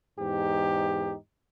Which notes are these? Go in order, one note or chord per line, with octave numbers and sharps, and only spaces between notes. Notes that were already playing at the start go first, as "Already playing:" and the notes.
E2 G#2 D#4 G4